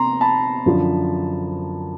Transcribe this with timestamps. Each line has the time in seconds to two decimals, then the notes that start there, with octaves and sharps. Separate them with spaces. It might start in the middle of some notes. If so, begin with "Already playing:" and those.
Already playing: C3 A#5 C6
0.21 A5 B5
0.66 F#2 D3 F3